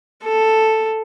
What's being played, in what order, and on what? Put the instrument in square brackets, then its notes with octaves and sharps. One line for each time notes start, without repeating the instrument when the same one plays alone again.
[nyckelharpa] A4